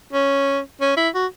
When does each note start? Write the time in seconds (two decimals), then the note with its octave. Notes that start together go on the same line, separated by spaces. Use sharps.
0.13 C#4
0.81 C#4
0.97 E4
1.14 F#4